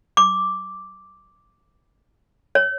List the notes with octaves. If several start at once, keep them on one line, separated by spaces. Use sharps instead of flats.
D6
C#5